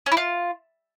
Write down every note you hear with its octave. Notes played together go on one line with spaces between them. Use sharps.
C#4
E4
F4